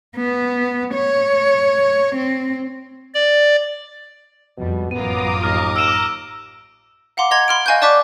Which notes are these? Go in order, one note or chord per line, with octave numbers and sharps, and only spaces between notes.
B3
C#5
C4
D5
F2 B2 G3
A1 F#2 B3 F4 A#5 D6 D#6 D#7
D#2 F6 A#6
E6 D7 E7
F5 F#5 A#5 C6 D6
D#5 A#5 C6 G#6 F7
B5 C6 F6 D7
D#5 F5 G#5 C#6 F#6 G6
D5 A5 C#6 D6 F#6 B6